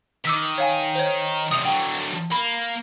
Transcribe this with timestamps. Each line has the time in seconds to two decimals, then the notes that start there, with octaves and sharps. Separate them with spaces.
0.25 D#3 D6 E6 B6
0.58 C#5 F5 G#5
0.95 C5 C#5
1.51 E2 C3 D#6 F7
1.65 D3 F#3 G5
2.32 A#3 B5